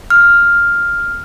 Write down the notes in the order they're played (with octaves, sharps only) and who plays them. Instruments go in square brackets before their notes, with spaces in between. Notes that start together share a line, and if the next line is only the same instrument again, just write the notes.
[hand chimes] F6